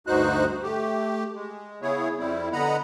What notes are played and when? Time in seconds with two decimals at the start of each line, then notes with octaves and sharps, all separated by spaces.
0.07 D2 G2 D#4 F#4 C5 F#6
0.62 A3 G4
1.35 G#3
1.82 C#3 B3 E4 G#4 C#5
2.18 F2 G3 C4 E4
2.53 D3 B3 D#5 F#5 A#5 B5